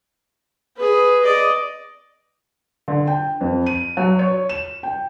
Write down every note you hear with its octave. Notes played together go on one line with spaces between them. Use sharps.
G#4 B4
D5 D#5
D3
G5
F2
D#7
F#3
C#5
E7
G5